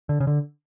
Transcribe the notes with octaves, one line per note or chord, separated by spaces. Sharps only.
D3
C#3
D3